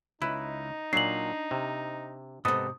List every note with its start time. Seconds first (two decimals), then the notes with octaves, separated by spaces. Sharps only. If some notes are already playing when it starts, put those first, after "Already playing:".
0.22 C#2 D#4 E4 B4
0.93 A#2 F#3 D4 C7 F#7
1.51 C3
2.45 G#2 C3 B3 A4 D#5 D#6